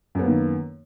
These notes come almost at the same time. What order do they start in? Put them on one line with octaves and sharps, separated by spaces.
F#2 B3 A#3 D#3